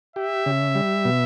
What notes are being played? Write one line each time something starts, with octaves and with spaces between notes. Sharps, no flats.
G4 E5
C#3
G3
B2